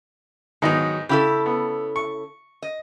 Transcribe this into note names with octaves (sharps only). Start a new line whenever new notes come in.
G#2 D#3 F#3 B3 D#4
C#3 E4 G4 A4
B3
C#6
D#5